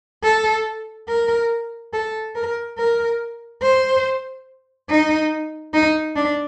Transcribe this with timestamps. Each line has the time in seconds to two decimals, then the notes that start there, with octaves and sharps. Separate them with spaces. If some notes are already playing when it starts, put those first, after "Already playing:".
0.24 A4
1.09 A#4
1.93 A4
2.35 A#4
2.78 A#4
3.62 C5
4.89 D#4
5.74 D#4
6.16 D4